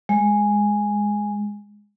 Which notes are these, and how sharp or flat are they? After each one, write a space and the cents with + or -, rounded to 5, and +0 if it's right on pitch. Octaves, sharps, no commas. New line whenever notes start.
G#3 -5